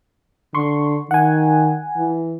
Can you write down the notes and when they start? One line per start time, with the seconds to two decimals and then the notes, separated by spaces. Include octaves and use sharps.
0.55 D3 C6 C#6
1.11 D#3 F#5 G#5
1.97 E3